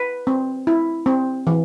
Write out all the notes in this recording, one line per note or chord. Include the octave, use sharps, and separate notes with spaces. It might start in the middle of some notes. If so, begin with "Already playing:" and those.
Already playing: B4
C4
E4
C4
E3